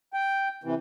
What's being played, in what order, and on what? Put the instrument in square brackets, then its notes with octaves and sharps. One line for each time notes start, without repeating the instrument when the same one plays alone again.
[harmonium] G5
C3 E3